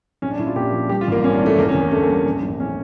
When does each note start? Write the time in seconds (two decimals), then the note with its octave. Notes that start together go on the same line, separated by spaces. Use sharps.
0.22 A#1 C#4
0.31 D4
0.39 A#1 E4
0.47 F4
0.56 A#2 G4
0.73 F3
0.89 G3 G4
1.01 F4
1.07 A1 A#3
1.24 G2 C#4
1.35 D4
1.41 E3 A3
1.58 E2 A#3
1.69 C#4
1.75 E2
1.81 A#3
1.91 D3 A3
2.03 A#3
2.08 G3
2.15 A3
2.26 A#1
2.43 A#1
2.60 A2 C#4